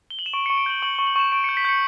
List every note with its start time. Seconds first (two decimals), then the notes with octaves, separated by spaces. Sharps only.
0.10 G7
0.19 F#7
0.26 E7
0.33 C#6 D7
0.46 C#7
0.50 C#6
0.57 D7
0.66 G6 F#7
0.82 C#6 F#7
0.95 G7
0.99 C#6
1.07 F#7
1.16 C#6 E7
1.32 C#6 D7
1.44 C#7
1.49 G6
1.57 B6
1.65 G6 C#7